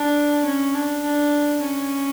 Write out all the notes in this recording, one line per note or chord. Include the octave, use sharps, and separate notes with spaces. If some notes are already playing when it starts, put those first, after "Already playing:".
Already playing: D4
C#4
D4
D4
C#4